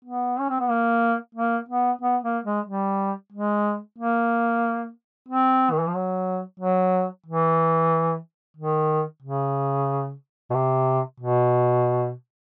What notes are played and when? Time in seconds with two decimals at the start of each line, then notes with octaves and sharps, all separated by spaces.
0.05 B3
0.40 C#4
0.49 C4
0.59 B3
0.70 A#3
1.35 A#3
1.69 B3
2.01 B3
2.23 A#3
2.45 G#3
2.66 G3
3.32 G#3
3.98 A#3
5.28 C4
5.72 D#3
5.80 E3
5.87 F3
5.95 F#3
6.60 F#3
7.26 E3
8.57 D#3
9.22 C#3
10.50 B2
10.54 C3
11.20 B2